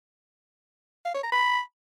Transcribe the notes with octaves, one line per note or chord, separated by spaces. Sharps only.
F5
C#5
A#5
B5